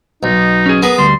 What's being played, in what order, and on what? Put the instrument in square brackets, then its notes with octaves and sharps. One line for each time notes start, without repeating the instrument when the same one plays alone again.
[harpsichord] B1 [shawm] D#4
[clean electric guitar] C#4 G#4
[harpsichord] B3 [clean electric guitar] G#4 A#4 B4
[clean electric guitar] D2 G3 [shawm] C6